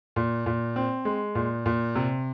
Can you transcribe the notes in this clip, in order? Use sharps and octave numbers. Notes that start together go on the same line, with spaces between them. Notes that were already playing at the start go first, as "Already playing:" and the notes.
A#2
A#2
C4
G#3
A#2
A#2
C3